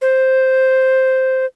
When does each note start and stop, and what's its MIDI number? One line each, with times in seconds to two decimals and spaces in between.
0.02 1.46 72